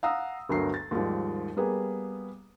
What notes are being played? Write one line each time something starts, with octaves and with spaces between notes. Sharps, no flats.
F5 F#5 A#5 D#6 E6
G1 D2 F#3 A#4 C7
A6
D#2 G#2 D#3 F3 G3
G3 A#3 B3 G#4